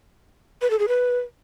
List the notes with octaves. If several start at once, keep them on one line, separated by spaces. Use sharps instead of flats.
B4
A4
G#4
B4